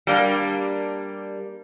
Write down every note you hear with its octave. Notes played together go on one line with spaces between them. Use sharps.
G3 A#3 D4